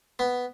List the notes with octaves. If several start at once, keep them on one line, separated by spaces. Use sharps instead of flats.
B3